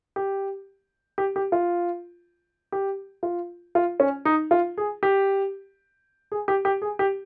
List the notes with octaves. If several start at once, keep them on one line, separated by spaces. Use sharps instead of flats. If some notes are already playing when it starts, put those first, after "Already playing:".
G4
G4
G4
F4
G4
F4
F4
C#4
D#4
F4
G#4
G4
G#4
G4
G4
G#4
G4